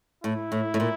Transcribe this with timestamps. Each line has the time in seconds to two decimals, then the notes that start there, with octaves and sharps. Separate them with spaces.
0.24 A2 E4
0.52 A2
0.74 A2
0.80 A#2